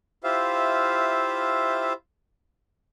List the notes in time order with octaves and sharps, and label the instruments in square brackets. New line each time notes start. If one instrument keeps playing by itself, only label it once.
[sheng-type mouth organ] E4 F4 G4 C5 E5 F5